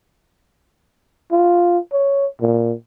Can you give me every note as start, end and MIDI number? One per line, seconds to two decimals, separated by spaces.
1.32 1.78 65
1.93 2.26 73
2.41 2.73 46